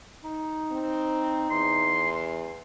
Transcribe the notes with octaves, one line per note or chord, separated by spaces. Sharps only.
D#4
C4
E2 C6